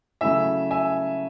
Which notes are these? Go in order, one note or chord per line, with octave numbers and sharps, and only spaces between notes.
C#3 F#3 A3 E4 E5 G#5
E5 G#5